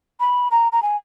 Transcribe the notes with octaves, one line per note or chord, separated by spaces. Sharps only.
B5
A#5
A#5
G#5